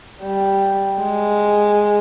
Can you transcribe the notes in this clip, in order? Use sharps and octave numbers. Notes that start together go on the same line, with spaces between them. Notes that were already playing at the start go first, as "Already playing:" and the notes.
G3
G#3